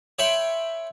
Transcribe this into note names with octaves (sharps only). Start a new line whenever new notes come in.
C#5 E5 G5 B5 C6